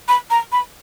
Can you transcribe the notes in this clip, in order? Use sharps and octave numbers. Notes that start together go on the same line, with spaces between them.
B5
A#5
B5